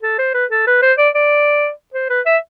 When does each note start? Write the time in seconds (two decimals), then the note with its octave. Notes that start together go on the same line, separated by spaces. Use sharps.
0.03 A4
0.19 C5
0.34 B4
0.51 A4
0.67 B4
0.82 C5
0.98 D5
1.15 D5
1.94 C5
2.10 B4
2.26 E5